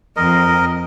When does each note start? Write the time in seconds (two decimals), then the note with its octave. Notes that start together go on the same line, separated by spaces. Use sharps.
0.16 F2 A#4 D#5